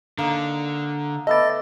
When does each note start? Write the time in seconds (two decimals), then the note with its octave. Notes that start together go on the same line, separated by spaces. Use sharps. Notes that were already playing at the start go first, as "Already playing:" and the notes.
0.18 D3 A#3 D#4
1.27 A3 B3 D5 D#5 A6